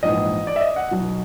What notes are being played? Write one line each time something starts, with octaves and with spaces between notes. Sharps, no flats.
A#1 G#2 E3 D#5
D5
E5
D#5
F#5
B1 B2